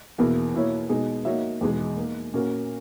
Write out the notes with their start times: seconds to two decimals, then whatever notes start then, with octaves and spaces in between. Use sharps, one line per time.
0.18 E2 B2 A#3 E4 A#4
0.54 B2 A#3 E4 A#4 C#5
0.89 B2 G#3 D#4 G#4
1.25 A#3 D#4 F#4 C#5 E5
1.61 E2 B2 G#3 D#4
1.97 A#3 D#4 A#4
2.33 A#2 A#3 C#4 F#4 A#4